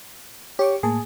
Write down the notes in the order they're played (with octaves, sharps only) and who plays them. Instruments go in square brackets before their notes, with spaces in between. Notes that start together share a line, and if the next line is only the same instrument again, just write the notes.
[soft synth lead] G4 [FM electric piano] C#5 C#6 D6
[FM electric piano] A2 A#3 A5 [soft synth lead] G#4